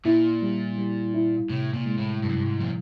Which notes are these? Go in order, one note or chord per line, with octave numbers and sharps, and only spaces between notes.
A#2 E4
G3
G3
E4
A2 C3
A#2
G#3
A2
G2 C3
F#2
G2
G#2
A#2 F3